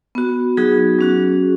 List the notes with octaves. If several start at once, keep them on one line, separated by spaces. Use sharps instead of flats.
B3 F#4
F#3 B3 D#4 F#4 G#4
F#3 C#4 F#4